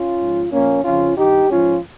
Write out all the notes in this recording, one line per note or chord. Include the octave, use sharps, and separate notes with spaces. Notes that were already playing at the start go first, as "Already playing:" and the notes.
Already playing: C#4 F4
G#2 F3
A#2 F3 A#3 C#4
F2 C#3 F3 C#4 F4
G2 D#3 D#4 G4
G#2 F3 C#4 F4